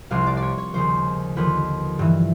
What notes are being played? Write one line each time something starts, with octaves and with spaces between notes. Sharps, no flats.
C2 C3 F3 F5
D5
D5
C#5
C#5
D#2 C#3 F3 C5
D#2 D3 F3 B4
G2 E3